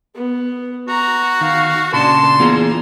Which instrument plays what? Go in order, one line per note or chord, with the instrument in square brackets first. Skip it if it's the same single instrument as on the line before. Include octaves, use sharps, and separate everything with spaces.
[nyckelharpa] B3
[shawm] F#4 [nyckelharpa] A#5
[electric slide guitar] D#3 [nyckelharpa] F5
[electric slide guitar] A#2 C#3 F#4 [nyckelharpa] D4 A5 [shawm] C6
[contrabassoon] E2 [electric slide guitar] A#3 F4 G#4 [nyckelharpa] A#5